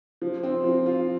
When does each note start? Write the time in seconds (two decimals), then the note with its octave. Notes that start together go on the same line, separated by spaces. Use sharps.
0.22 F3
0.43 C4
0.64 F3
0.86 F4